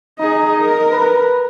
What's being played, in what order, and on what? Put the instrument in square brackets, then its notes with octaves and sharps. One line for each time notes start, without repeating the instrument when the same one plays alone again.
[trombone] D#4 [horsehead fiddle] G#4 D#5
[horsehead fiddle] A#4
[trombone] B4